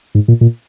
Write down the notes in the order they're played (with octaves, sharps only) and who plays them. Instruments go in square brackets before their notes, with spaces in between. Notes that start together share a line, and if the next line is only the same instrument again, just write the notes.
[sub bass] G#2
A#2
A#2